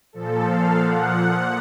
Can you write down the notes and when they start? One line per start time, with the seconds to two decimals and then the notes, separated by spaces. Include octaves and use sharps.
0.13 A#2 F3 A4
0.46 F5
0.77 A#2 F3 F#5
1.09 F#5